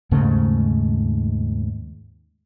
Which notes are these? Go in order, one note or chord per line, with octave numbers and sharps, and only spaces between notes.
D#2 G#2 C#3 A3